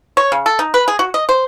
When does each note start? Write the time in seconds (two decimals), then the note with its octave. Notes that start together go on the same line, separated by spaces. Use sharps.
0.17 C#5
0.32 C#3
0.46 A4
0.59 D#4
0.74 B4
0.88 G#4
0.99 F#4
1.14 D#5
1.29 C5